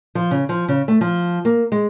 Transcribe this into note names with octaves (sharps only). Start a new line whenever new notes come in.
F3
C#3
F3
C#3
A3
F3
A#3
G#3